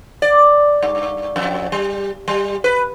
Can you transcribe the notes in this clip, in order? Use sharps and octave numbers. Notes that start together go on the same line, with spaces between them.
D5
G2
F2
G3
G3
B4